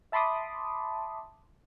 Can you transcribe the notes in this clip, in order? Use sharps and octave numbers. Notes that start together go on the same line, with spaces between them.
E5 A5 B5 C6 D6 D#6